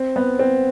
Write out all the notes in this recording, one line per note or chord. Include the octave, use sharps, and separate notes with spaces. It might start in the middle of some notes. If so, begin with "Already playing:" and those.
Already playing: C4
B3
C4